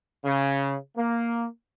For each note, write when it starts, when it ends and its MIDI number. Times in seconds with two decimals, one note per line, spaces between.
0.25 0.75 49
0.97 1.46 58